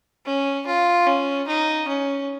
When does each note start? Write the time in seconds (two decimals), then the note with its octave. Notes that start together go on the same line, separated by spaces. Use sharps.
0.25 C#4
0.67 F4
1.06 C#4
1.48 D#4
1.88 C#4